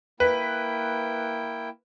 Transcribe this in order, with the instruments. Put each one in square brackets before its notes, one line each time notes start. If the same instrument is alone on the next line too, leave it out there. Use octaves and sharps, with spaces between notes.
[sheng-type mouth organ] A#3 E4 G5 [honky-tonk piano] B4